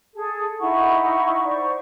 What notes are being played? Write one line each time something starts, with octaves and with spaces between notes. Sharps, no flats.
G#4 A4
D#4 E4 F#5 C#6
C5 D5 C#6